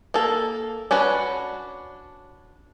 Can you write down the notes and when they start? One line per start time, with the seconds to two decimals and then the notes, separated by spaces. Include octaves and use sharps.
0.14 A#3 A4
0.91 C#4 D4 F#4 B4